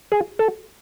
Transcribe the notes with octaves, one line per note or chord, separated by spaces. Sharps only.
G#4
A4